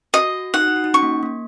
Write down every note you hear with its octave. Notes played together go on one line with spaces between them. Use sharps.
F#4 D#5
D#4 F#5
F#4
D#4
F#4
D#4
C#4 C#6
A#3
A#3